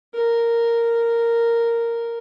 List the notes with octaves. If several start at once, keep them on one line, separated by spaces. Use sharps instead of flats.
A#4